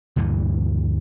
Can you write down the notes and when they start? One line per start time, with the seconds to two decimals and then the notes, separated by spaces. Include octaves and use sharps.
0.16 D2 G2 A#2 E3